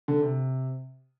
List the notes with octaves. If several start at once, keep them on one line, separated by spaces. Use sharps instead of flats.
D3
C3